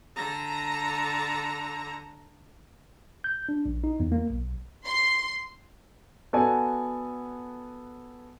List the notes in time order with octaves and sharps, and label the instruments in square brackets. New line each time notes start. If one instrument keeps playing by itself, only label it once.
[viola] D3 A#5
[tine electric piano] G6
D4
A#1
D#4
E2
A#3
B1
[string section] C6
[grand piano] B3 F#4 A4 D5 G#5